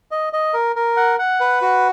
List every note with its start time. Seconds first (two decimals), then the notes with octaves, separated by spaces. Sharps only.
0.11 D#5
0.33 D#5
0.54 A#4
0.76 A#4
0.97 F#5
1.19 F#5
1.40 B4
1.62 F#4